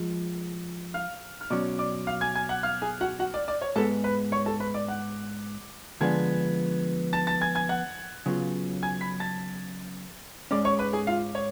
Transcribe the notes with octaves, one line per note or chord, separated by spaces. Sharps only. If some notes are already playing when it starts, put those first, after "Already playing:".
Already playing: F3 G#3
F5 F6
F6
B2 F#3 C#4 D5 D6
D5 D6
F5 F6
G#5 G#6
G#5 G#6
F#5 F#6
F5 F6
G#4 G#5
F#4 F#5
F#4 F#5
D5
D5
C#5
G#2 G#3 B3 A4 A5
B4 B5
C#5 C#6
A4 A5
B4 B5
D5 D6
F#5 F#6
D3 F3 G#3 B3 D4 G#5 G#6
A5 A6
A5 A6
G#5 G#6
G#5 G#6
F#5 F#6
C#3 F#3 B3 F4
G#5 G#6
B5 B6
A5 A6
G#2 G#3 C#4 D5 D6
C#5 C#6
B4 B5
G#4 G#5
F4 F5
C#5